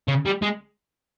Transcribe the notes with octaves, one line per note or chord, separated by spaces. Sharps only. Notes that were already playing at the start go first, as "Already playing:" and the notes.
C#3
G3
G#3